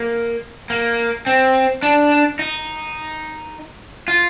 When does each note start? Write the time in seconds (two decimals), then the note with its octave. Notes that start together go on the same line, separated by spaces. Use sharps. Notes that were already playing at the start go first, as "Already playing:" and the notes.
Already playing: A#3
0.70 A#3
1.27 C4
1.83 D4
2.39 D#4
4.08 F4